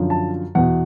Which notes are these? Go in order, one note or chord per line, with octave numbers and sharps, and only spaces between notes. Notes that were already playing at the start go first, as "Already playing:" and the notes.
Already playing: F#2 D3 F3
A5
E2 B2 F#5